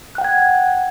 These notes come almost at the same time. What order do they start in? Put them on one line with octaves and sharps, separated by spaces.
F#6 G5 F#5 G#6